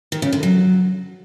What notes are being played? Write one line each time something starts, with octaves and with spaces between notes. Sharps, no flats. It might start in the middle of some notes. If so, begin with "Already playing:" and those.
D#3
C#3
D3
F#3